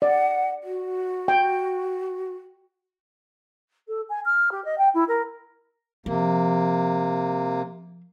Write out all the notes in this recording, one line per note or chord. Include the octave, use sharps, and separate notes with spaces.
D5 F#5
F#4
G5
A4
G#5
F6
G4
D#5
G5
E4
A#4
C3 F3 A#3